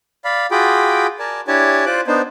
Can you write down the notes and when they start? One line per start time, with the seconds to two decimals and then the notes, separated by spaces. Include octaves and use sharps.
0.24 D5 F5 B5
0.51 F4 F#4 G#4 G5 B5 D6
1.19 A#4 D5 G#5 A5
1.48 D4 E4 G4 C#5 G#5 A5
1.86 F4 C5 D5 D6 F#6
2.07 B3 D4 D#4 C5